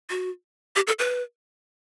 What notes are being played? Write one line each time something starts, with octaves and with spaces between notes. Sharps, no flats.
F#4
G4
A4
B4